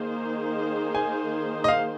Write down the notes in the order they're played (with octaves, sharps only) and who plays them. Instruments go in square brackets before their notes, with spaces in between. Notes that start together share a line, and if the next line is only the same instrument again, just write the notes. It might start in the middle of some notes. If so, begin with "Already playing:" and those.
Already playing: [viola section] D#3 A#3 D#4 G#4 C5
[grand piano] G#5
D#5
F5